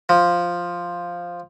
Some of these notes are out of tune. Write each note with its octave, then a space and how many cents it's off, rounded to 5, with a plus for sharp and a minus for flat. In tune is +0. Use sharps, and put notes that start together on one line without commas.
F3 +0